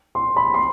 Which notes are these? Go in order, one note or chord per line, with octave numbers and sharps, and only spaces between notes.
C6
B5
C6